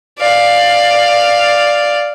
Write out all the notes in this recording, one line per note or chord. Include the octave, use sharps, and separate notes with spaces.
D5 F5